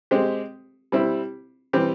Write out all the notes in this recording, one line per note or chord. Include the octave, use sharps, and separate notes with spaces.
G#3 C4 G4
G3 C4 E4
E3 G3 C4 G4